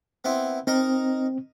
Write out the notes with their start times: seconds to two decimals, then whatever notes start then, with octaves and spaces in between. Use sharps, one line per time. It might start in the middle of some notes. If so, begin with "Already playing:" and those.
0.24 B3 C4 E4
0.67 C4 D#4 A#4 A#5